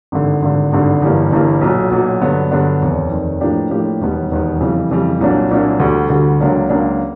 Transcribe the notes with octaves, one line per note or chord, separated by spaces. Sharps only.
G#1 G2 D3
G#1 G2 D3
G#1 G2 D3
G1 G2 E3 G3 A#3
G1 G2 E3 G3 A#3
B1 A#2 F#3
B1 A#2 F#3
G2 D3 F#3 B3 D4
G2 D3 F#3 B3 D4
F1 D#2 D#3
F1 D#2 D#3
A2 F3 A#3 D4 G4
A2 F3 A#3 D4 G4
E1 D#2 D#3 G3 B3
E1 D#2 D#3 G3 B3
F2 C#3 E3 G3
F2 C#3 E3 G3
C2 A#2 F#3 A#3 D4
C2 A#2 F#3 A#3 D4
D2 D3 G3
D2 D3 G3
C#2 C#3 F#3 A#3 D4
C#2 C#3 F#3 A#3 D4